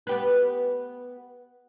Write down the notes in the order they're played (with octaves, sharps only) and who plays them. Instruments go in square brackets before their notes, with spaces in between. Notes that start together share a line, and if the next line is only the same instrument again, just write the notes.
[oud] B3 G4 B4